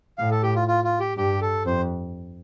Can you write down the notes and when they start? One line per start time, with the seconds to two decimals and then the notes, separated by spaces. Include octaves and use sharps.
0.18 A2 F5
0.31 A4
0.43 G4
0.56 F4
0.68 F4
0.84 F4
1.00 G4
1.17 G2 G4
1.41 A4
1.66 F2 C5